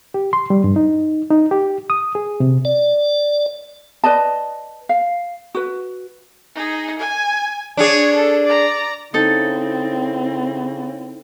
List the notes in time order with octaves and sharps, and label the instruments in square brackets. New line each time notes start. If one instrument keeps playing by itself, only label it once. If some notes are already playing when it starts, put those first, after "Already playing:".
[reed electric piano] G4
C6
G3
G2
D#4
D#4
G4
D#6
G#4
C3
[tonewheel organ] D5
[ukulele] B4 D5 D#5 A5
F5
F#4 B4
[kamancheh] D#4 G#4
G#5
[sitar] D4 G#4 [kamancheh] C#5
[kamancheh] A4
D5 A#5
[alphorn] C#3 [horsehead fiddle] C4 E4 [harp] D#4 A4